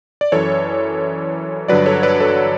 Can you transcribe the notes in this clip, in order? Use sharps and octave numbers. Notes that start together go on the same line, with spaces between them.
D5
F#2 E3 A4 C#5
G2 D3 F#3 B4 D5
A4 C#5
B4 D5
A4 C#5